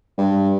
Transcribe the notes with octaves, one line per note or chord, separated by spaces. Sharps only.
G2